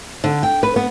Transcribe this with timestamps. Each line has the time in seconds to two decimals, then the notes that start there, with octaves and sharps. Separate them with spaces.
0.24 D3
0.43 G5
0.63 B4
0.76 B3